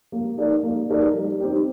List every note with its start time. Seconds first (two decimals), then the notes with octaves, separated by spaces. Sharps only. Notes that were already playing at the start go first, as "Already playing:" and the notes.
0.12 A#3
0.37 D#4 A#4 D5
0.63 A#3
0.89 D#4 A#4 D5
1.14 G3
1.40 C4 D#4 G4